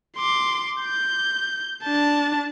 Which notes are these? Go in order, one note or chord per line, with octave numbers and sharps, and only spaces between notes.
C6 D6
G6
D4 A5